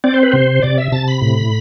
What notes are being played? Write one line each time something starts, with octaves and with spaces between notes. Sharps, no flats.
C4 D5
C5
B4
C3 C5
C3 D5
E5
C3 A5
B5
A2